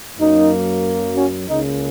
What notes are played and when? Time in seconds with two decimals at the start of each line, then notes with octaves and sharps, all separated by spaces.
0.19 F#2 F#3 A#3 D#4
1.15 C#4 F#4
1.47 C#2 C#3 A#3 D#4